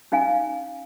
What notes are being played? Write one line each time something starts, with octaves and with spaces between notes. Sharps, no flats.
C#4 D#4 F5 G#5